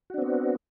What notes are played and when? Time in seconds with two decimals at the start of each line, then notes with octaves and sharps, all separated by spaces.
0.10 F#4
0.14 D4
0.18 C4
0.22 B3